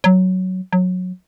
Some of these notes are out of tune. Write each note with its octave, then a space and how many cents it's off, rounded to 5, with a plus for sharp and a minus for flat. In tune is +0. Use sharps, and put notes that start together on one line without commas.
F#3 +5
F#3 -20